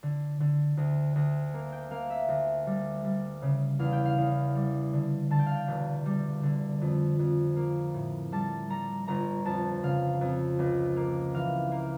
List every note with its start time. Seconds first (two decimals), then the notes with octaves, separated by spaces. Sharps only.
0.03 D3
0.40 D3
0.77 D2
1.16 D2
1.54 A#3
1.72 G5
1.91 A#3 F5
2.10 E5
2.29 D2
2.67 G3
3.04 G3
3.42 C#3
3.79 E2 F5
3.92 G5
4.05 F5
4.17 E2
4.55 G3
4.93 D3
5.30 D3 A5
5.39 G5
5.46 F5
5.55 G5
5.68 E1
6.06 G3
6.43 D3
6.81 F2
7.19 F2
7.56 A#3
7.94 A2
8.32 G3 A5
8.70 G3 A#5
9.08 G1 A#5
9.45 F2 A5
9.83 C#3 F5
10.21 F2
10.59 C#2
10.97 A#3
11.34 E3 F5
11.72 A#3